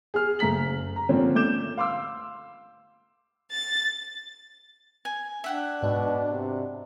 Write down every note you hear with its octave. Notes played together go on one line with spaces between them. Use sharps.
G#4 F6
F#1 A3 A#5 B6 F#7
A#5
D3 F3 A#3 C4 C#4
A3 D6 G6 E7
F5 C6 D6 E6
A6
G#5
D4 E5 F#5 G5
G#2 B2 D5
C3